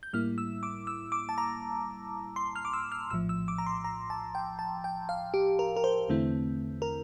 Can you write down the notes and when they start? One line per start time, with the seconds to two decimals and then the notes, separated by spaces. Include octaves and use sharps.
0.03 G6
0.13 A2 G3 A#3 E4 F6
0.38 E6
0.63 D6
0.87 E6
1.12 D6
1.29 A5
1.38 A#5
2.36 C6
2.56 F6
2.65 D6
2.73 E6
2.92 F6
3.10 A#1 A2 F3 E6
3.29 E6
3.48 D6
3.58 A#5
3.66 C6
3.84 A#5
4.10 A5
4.35 G5
4.59 A5
4.84 G5
5.09 F5
5.34 G4
5.59 A#4
5.76 A#4
5.84 C5
6.08 E2 D3 A3 C4 E4
6.82 A#4